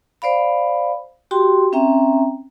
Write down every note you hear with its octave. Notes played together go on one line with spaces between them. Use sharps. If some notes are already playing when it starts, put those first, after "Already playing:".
C5 D5 F5 B5
F#4 G4 G5 C6
C4 C#4 E5 G5 A#5